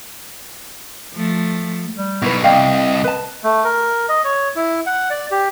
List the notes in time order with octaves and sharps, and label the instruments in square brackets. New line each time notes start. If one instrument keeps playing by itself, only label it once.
[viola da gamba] F3 A3
[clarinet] G3
[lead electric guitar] B1 B2 [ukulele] E4 B4
[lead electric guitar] C2 [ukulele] D5 F5 G5 [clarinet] D#5
[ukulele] B4 A5
[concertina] A3
A#4
D#5
C#5
E4
F#5
D5
G4